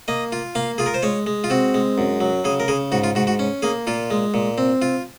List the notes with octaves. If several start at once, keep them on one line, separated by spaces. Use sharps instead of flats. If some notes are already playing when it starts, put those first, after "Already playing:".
A#3 D#5
F4
A#3 F5
F4 G#4
A#4
C5
G#3 C#5
G#3
F4
C4 F#4
G#3
F#2
F#3
C#3 G#4
A#4
C#3 G#4
G#2 F#4
F4
G#2 F#4
F#4
C#4
A#3 G#4
A#2 F4
G#3
A#2
C4
F4